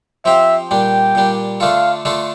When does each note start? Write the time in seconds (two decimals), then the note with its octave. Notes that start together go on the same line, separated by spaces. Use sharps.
0.25 F3 C4 G4 C5 E5 F5
0.70 A#2 G3 D4 G5
1.15 A#2 G3 D4
1.60 D3 A3 D4 F4 A4 F5
2.05 D3 A3 D4 F4 A4